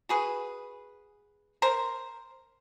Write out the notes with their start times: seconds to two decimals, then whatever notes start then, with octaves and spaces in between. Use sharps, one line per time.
0.09 F#4 G#4 B4
1.62 A#4 C5 A#5